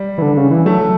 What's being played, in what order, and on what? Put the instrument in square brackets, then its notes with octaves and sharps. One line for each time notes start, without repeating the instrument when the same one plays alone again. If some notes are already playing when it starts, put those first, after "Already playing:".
Already playing: [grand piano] G3
[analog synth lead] E3
D3
C#3
E3
[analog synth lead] F#3 [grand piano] A3